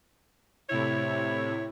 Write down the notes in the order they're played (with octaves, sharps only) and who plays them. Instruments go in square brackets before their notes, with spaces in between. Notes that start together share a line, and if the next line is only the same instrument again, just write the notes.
[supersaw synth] A2 C3 E4 [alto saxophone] C#5